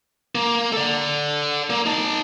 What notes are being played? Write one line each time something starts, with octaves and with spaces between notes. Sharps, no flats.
A#3
A4 D5
A#3
D#4 A5